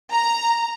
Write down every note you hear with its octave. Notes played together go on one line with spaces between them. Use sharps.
A#5